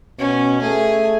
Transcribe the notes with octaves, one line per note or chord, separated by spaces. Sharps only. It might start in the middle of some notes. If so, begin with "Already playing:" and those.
B2 C#4
A3 G#4